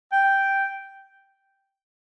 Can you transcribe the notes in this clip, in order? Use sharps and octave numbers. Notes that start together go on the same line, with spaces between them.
G5